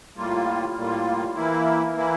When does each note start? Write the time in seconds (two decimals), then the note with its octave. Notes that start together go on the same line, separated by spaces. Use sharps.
0.17 A2 G3 A#3 F4
0.76 A2 G3 A#3 F4
1.35 E3 A#3 E4
1.94 E3 A#3 E4